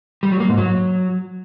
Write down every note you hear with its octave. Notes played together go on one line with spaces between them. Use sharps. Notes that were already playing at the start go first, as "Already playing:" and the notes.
G3
F#3
A#3
G#2
F#3